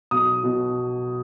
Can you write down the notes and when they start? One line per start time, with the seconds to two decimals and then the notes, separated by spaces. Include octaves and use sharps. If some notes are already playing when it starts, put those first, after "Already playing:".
0.11 B1 D#6
0.44 B2